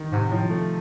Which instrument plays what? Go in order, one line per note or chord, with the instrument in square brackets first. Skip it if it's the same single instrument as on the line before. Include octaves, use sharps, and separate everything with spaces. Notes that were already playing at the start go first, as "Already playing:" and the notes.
Already playing: [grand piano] D#3
[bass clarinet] G#2 [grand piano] C3
[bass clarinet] A2 [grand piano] F3
[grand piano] A3